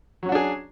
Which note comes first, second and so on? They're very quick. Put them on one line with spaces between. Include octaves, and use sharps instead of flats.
F#3 C#4 F#4 D4 G#4